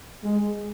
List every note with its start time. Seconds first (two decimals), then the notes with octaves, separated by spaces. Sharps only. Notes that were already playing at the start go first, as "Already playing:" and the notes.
0.24 G#3